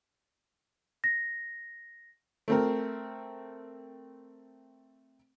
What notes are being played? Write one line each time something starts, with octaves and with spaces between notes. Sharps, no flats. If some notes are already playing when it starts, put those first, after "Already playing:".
A#6
A3 C4 A#4